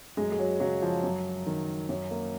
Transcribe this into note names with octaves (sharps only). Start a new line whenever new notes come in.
F#2 G#3
G#3
F#3
C#3 F#3
F3
F#2 F#3
D#3
F#2 F#3
A#3